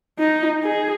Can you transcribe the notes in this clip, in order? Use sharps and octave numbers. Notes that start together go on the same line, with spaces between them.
D#4
G#4